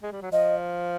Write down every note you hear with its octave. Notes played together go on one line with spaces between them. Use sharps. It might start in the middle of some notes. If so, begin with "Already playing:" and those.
G#3
G3
F#3
F3 D#5